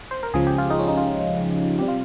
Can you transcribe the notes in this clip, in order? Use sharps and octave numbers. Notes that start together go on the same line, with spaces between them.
C5
A#4
C#2 C#3 F3 G#4
G4
F4
D#4
C#4
D#4
F4
C3 G3 G4
F4